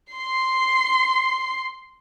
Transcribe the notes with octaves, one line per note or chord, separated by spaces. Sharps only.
C6 C7